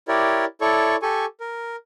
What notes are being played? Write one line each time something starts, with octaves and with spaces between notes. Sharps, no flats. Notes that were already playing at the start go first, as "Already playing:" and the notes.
E4 G4 A#4 C#5 D5
E4 A4 C#5 D5 C#6
G4 A4 G#5 C#6
A#4